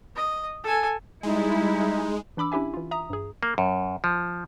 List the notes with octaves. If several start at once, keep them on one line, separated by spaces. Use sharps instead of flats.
D#5
A4 G#5
G3 G#3 D#4 E4
E3 D4 B5 D6 E6
C#4 D4 E4 G4 E5 G#5
E3 F4
E5 A#5 D#6
G2 G#4
A#3
F#2
F3